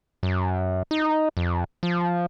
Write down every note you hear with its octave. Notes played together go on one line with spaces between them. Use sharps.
F#2
D#4
F2
F3